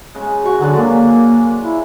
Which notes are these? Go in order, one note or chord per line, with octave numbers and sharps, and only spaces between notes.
C#3 G#3
F#4 F#5 C#6
D3 F#3 G#3 D5
A#3
E4